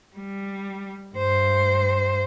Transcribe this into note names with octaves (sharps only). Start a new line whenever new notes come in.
G3
G2 C5